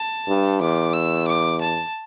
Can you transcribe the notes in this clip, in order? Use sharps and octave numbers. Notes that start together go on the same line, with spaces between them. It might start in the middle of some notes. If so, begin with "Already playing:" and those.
Already playing: A5
G2
E2 D6
E6
D6
A5